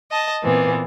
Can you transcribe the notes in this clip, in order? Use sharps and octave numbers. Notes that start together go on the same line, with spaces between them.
D#5 A5
A#2 E3 B3 C4